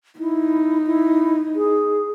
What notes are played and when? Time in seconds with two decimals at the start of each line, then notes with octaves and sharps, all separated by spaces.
0.19 D#4 E4
0.86 E4
1.56 G#4